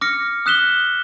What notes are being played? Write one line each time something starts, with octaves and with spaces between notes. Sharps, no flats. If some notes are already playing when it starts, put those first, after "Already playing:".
D6 F6 A#6 C#7
D#6 F#6 B6 E7 G7